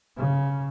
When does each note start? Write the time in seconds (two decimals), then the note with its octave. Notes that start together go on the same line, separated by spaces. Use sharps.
0.17 C#3